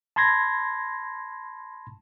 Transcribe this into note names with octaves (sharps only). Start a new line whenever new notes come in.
A5 B5 C6 G#6 A#6